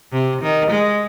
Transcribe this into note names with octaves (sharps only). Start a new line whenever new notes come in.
C3
D#3
G#3